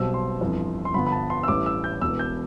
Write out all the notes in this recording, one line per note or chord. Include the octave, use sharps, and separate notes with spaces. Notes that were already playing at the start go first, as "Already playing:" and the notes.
Already playing: B1 B2 G3 C4 E6
C6
G1 F2 E3
C6
G2 D3 F3 B3 B5
B5
A5
C6
E6
A1 A2 G3 D6
E6
G6
E1 E2 B2 E6
G6